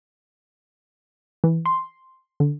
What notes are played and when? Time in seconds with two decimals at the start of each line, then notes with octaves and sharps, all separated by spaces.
1.44 E3
1.66 C6
2.40 D3